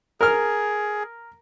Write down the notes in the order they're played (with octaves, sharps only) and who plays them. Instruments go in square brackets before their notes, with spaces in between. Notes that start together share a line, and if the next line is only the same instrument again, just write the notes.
[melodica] G#4 [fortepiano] A#4 F6